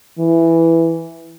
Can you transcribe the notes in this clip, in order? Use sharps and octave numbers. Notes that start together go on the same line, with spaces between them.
E3